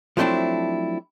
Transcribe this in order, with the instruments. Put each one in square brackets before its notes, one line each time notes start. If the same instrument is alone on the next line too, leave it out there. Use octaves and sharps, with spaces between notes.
[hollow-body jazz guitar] F3 F#3 A3 C4 D4 E4